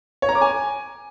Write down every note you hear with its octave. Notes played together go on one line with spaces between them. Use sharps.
C#5
A#5
D6
G#5